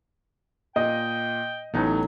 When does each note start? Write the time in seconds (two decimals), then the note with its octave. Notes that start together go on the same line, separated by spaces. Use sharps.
0.76 A#2 D#5 G5
1.74 A1 A2 F#3 B3 D#4